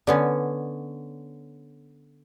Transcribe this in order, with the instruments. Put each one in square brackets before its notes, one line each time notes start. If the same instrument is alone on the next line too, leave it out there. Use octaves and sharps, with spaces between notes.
[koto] D3 B3 C#4